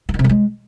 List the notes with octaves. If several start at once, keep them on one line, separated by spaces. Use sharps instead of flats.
E3
D#3
C3
F#3
G#3